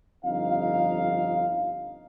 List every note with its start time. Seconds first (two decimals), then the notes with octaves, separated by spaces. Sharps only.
0.24 G1 F2 D#4 F5